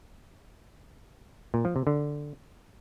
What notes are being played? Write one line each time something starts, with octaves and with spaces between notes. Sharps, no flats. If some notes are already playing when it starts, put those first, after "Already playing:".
A#2
F3
C3
D3